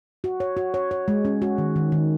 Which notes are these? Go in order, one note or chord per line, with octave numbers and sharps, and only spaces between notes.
F#4
C#5
F#4
C#5
C#5
G#3
C#4
F#4
D#3
D#3
D#3